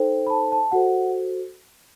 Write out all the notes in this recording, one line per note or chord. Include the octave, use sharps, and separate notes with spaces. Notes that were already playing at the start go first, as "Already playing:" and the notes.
Already playing: D#4 A4 C5 G5
B5
A5
A5
F#4 A4 C5 F#5